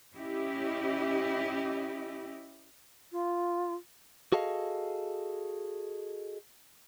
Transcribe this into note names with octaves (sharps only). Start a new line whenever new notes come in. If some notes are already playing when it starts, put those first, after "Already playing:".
C#4 E4 G4 D#5
F4
F#4 G#4 A4 D#5 F5